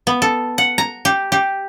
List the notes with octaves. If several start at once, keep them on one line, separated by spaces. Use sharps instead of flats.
B3
A4
F#5
A#5
G4
G4